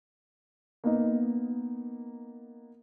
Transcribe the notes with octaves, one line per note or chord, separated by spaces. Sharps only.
A#3 B3 D#4